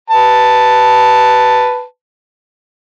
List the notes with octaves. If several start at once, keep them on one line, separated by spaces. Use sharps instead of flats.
B4 A5